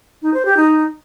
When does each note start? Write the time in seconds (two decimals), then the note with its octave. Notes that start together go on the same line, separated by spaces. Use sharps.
0.22 D#4
0.34 C5
0.45 G4
0.57 D#4